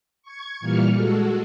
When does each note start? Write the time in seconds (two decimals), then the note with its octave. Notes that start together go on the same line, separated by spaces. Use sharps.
0.22 C#6 G#6
0.60 A#2 E3 G3 A#3 F6 C#7
0.96 G#3 F#4 A4